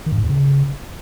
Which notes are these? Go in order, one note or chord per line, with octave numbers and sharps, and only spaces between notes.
D#3
G2
G#2
E2
C#3